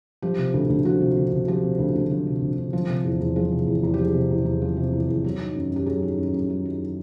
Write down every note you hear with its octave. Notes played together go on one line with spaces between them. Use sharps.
F3 G4
C3
D2
D2
F3 F#4
C3
D2
D2
F3 G4
C3
D2
D2
F3
C3
D2
D2
F3
C3
E2
E2
F3 G#4
C3
E2
E2
G4
F3 G#4
C3
E2
E2
F3
C3
E2
E2
F#3
D#3
F#2
F#2 G4
F#3 G#4
D#3
F#2
F#2
F#3
D#3